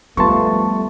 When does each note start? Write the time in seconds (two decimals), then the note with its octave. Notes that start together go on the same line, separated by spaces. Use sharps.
0.17 F3 G3 A3 B3 A5 C6 C#6